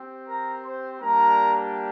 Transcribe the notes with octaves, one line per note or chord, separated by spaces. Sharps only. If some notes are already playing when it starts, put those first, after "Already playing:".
Already playing: C4 G4
A#4 A#5
C5 C6
G3 A#3 D4 G4 A#4 A#5